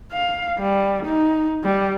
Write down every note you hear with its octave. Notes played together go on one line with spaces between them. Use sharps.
F5
G3
D#4
G3